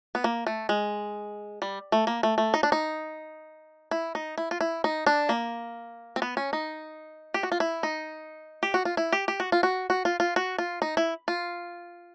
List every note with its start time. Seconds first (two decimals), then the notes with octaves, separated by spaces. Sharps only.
0.15 B3
0.24 A#3
0.47 A3
0.69 G#3
1.62 G3
1.92 A3
2.07 A#3
2.23 A3
2.38 A3
2.54 D#4
2.63 D4
2.72 D#4
3.91 E4
4.15 D#4
4.38 E4
4.51 F4
4.61 E4
4.84 D#4
5.06 D4
5.29 A#3
6.16 C4
6.22 B3
6.37 C#4
6.53 D#4
7.34 G4
7.43 F#4
7.52 F4
7.60 E4
7.83 D#4
8.63 G4
8.74 F#4
8.85 F4
8.97 E4
9.12 G4
9.28 G4
9.40 F#4
9.52 F4
9.63 F#4
9.90 F#4
10.05 F4
10.20 F4
10.36 F#4
10.58 F4
10.82 D#4
10.97 E4
11.28 F4